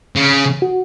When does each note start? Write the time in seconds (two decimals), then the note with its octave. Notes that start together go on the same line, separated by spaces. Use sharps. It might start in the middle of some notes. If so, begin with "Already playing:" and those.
0.16 C#3
0.62 F#4